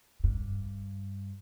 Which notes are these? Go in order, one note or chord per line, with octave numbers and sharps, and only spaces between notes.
G2